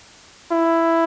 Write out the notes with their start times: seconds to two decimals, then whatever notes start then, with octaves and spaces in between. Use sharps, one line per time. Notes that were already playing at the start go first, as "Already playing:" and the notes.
0.51 E4